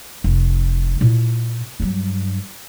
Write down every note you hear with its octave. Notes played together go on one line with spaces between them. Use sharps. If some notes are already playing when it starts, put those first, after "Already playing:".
F1
A#2 E4
G2 F#3